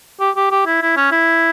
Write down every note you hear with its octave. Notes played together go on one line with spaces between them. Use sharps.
G4
G4
G4
E4
E4
C#4
E4